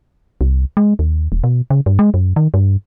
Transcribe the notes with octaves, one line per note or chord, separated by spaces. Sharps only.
C2
G#3
D#2
D#1
B2
C#3
G2
G#3
F#2
D#3
G2